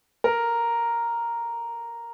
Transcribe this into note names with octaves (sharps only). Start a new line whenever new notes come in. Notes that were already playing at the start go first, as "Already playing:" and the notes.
A#4